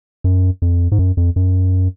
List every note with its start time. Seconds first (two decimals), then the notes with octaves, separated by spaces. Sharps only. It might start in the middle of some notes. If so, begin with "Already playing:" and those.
0.24 F#2
0.62 F2
0.92 G#2
0.99 F#2
1.17 F2
1.36 F#2